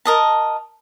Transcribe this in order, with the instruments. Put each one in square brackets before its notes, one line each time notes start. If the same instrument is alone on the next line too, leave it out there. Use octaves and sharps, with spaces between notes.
[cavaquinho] A#4 D#5 A5